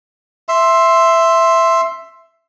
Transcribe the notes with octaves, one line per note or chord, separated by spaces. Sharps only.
E5 C6